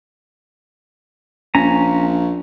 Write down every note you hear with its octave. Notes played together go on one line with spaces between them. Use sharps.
A#1 C#4 A#5